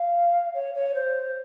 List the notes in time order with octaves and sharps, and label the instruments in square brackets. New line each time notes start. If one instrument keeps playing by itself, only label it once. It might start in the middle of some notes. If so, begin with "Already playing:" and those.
Already playing: [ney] F5
C#5
C#5
C5